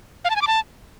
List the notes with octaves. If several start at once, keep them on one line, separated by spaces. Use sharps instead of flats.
F5
A5
G#5
D6
A5